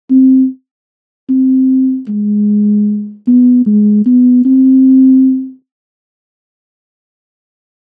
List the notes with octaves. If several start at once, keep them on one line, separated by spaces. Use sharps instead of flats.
C4
C4
G#3
B3
G#3
B3
C4